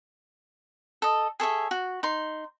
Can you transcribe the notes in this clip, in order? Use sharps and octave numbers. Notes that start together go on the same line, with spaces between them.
A4 D#5
G#4 A4 C#5 E5
F#4
D#4 C6